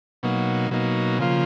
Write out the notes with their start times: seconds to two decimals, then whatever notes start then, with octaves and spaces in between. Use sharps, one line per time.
0.23 B2 F#3 A#3 D#4
0.71 B2 F#3 A#3 D#4
1.19 C#3 F3 A#3 F4